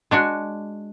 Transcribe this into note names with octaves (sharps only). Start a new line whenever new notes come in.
G#3 D4 F#4